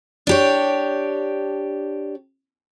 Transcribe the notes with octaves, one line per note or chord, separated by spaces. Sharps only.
D4 G4 C#5